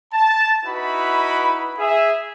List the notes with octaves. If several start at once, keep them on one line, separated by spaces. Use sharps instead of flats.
A5
D#4 E4 F#4 B4 B5
G#4 E5